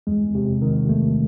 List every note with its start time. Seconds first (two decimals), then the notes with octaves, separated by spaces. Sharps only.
0.07 E2 G#3
0.35 C3
0.62 D#3
0.89 E2 A3